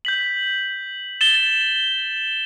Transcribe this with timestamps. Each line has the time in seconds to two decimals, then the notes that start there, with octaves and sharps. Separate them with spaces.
0.05 G6 B6 F#7
1.21 A6 E7 G7